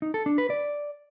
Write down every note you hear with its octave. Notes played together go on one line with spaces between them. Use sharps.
D#4
A4
D4
B4
D5